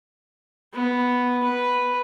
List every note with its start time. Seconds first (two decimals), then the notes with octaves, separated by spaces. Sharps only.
0.73 B3
1.43 B4